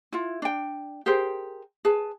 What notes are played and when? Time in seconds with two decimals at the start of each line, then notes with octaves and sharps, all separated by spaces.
0.12 E4 F4
0.42 D4 G5
1.06 G4 G#4 A#4 C5
1.85 G#4 B4 A5